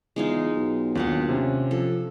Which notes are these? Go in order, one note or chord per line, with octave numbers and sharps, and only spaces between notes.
E2 G#3 D#4 F4
B1
D#2 D4 F4 F#5
C3 C#4
F3 A4